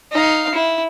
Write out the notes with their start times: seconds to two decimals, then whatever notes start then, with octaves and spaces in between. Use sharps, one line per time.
0.12 D#4 F5
0.54 E4